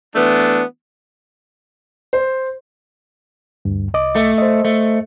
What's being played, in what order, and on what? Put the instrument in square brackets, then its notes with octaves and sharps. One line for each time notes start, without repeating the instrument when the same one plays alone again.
[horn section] E3 A3 B3 D4
[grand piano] C5
[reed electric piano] D2 G2
C2 D#5 D6
[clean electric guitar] A3
[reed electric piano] C5 D#5
[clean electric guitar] A3